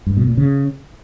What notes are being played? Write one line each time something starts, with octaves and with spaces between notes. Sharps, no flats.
G2
B2
A#2
C#3